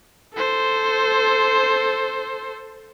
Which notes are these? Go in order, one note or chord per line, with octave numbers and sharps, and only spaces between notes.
A4 C5